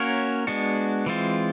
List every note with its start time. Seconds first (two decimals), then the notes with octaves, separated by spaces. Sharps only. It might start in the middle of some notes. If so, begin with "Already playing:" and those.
Already playing: A#3 C#4 F#4 A#4 C#5
0.47 G#3 B3 D4 F#4
1.06 E3 G#3 C4 F4